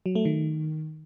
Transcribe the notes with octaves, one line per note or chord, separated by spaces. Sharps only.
F#3
A3
D#3